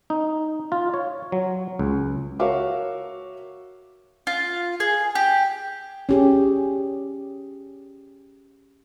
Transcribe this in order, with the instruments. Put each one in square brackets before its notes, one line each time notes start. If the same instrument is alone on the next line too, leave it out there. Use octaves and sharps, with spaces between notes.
[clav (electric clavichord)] D#4
F4
C#5
F#3
C#2
[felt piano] F#4 A#4 C#5 E5 F5 D6
[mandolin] F4
G#4
G4
[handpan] C#4 G4 G#4